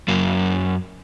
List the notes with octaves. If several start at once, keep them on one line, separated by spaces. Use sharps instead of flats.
F#2 A#3